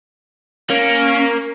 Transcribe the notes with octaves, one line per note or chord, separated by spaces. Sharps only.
A#3 C#4